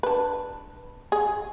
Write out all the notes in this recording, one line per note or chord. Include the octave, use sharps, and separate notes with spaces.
D4 B4
G#4